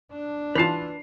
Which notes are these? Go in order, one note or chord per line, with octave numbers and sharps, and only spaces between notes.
D4
E3 F4 B4 A5 C7 F7